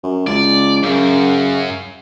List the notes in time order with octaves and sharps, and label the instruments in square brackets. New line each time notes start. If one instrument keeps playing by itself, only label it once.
[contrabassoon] F#2
[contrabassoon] C#2 [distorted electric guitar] D5
[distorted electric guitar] F#2 [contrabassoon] C#3